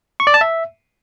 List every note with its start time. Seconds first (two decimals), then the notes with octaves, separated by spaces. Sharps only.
0.20 C#6
0.27 D5
0.34 A5
0.41 E5